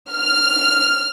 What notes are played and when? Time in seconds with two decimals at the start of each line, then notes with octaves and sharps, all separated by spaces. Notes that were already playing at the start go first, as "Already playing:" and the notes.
0.12 F6